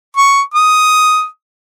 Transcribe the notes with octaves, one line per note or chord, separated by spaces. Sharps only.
C#6
D#6